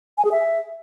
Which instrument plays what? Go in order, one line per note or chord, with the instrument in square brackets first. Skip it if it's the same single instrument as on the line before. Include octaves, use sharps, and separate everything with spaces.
[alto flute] G#5
G#4
E5